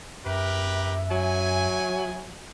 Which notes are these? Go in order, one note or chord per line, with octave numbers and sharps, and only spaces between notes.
F#2 G4 A#4 B4 E5
F#3 G#5